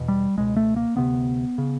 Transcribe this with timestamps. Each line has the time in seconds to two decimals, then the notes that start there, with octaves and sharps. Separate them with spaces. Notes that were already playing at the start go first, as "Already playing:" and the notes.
Already playing: E2 B2
0.08 G3
0.37 C#2 B2 G#3
0.57 A3
0.76 A#3
0.96 D2 C3 B3
1.58 C#3